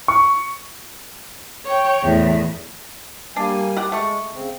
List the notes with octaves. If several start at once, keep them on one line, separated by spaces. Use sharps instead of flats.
C#6
C#5 G5
E2 A2
G3 A#3 D4 G#5
G4 D5 F#5
G#3 A3 C#6
C#3 C4